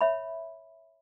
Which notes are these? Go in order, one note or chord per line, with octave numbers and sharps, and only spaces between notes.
C#5 E5 B5